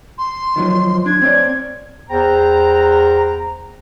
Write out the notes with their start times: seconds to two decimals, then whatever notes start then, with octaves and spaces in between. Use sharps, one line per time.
0.18 C6
0.56 D#3 F3 F#3
1.06 D4 G#6
1.22 C4 C#5 D5
2.10 E2 C5 G5 A#5